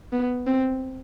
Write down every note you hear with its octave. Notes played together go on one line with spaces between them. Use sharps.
B3
C4